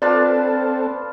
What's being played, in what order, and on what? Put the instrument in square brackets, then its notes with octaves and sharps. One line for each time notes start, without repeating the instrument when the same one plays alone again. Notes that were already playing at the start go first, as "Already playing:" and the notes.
[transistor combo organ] C4 A4 [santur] D4 F4 B4 [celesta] D5